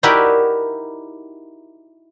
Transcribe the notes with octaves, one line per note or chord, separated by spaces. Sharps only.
D#4 E4 F#4 G4 A#4 D5